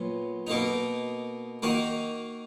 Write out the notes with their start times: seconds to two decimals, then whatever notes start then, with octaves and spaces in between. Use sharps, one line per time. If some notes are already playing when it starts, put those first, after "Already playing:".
Already playing: A#2 F#3 B3
0.47 B2 A#3 D#4
1.62 D#3 A#3 D#4 F#4